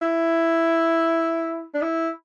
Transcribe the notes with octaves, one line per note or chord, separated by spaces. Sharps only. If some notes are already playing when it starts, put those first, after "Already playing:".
E4
D4
E4